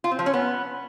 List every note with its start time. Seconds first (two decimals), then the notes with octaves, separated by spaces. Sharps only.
0.04 F4
0.11 C4
0.19 F3
0.26 C#4
0.34 B3